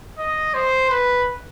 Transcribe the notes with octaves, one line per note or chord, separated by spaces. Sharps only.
D#5
C5
B4